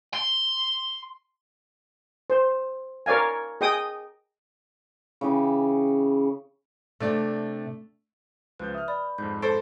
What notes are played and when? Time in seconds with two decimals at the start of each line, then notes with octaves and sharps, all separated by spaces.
0.14 C6
2.30 C5
3.06 A#4 C#5 D5 F5 G#5
3.61 G#4 D#5 G5 D#6
5.21 C#3 E3 G4
7.00 C3 A3 D4 D5
8.60 C#2 F3 B4 G6
8.75 E5 D#6 F6
8.88 D5 B5
9.18 F2 G#2 G6
9.42 A4 C5 D7